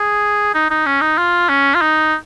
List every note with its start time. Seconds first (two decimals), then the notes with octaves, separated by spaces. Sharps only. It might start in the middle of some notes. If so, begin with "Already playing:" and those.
Already playing: G#4
0.54 D#4
0.70 D#4
0.86 C#4
1.01 D#4
1.18 F4
1.49 C#4
1.75 F4
1.81 D#4